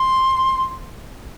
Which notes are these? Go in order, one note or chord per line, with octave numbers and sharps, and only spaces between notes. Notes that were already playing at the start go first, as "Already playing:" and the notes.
Already playing: C6